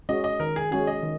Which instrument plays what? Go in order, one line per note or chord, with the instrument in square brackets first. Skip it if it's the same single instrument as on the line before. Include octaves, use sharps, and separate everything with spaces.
[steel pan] G#3 C#4 F#4 [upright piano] D#5
[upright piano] D#5
[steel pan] D#3 [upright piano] A#4
[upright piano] G#4
[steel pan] G#3 C#4 F#4 [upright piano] G#4
[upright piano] D#5
[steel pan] D#3